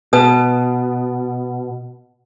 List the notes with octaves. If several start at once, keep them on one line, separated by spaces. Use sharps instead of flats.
B2 B4 A5 D#6